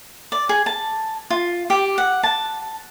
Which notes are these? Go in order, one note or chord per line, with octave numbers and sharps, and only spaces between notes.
D5
G#4
A5
F4
G4
F#5
A5